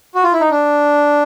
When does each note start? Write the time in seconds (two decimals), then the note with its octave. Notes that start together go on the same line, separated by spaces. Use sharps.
0.15 F#4
0.24 F4
0.33 E4
0.41 D#4
0.50 D4